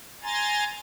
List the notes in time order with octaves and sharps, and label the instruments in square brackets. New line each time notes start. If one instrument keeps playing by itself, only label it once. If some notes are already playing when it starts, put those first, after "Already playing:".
[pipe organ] G#5 A#5 C6 A6